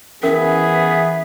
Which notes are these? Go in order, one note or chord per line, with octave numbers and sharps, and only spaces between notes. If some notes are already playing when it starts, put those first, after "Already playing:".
E3 B3 C#4 G#4 A#4 E5